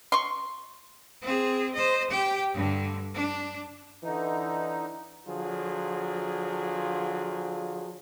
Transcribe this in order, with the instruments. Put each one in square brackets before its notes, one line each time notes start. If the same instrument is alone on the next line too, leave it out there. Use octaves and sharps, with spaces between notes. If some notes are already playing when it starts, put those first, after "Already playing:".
[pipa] C6 C#6
[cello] C4 G#4
C5 D#5
G4 G5
G2 D3
D4
[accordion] D3 D#4 [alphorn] E3
[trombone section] D3 F3 F#3 F4 G#4